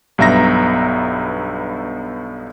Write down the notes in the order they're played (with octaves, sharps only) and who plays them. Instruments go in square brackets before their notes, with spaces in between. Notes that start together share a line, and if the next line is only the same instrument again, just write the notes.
[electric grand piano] B1 G2 B3 E5 A#5 A#6